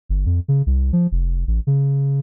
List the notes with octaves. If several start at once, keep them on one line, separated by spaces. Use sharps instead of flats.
G1
F2
C#3
C2
F3
F1
A1
C#3